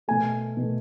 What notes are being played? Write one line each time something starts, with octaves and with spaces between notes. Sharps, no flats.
B2 A3 G#5
B2 A3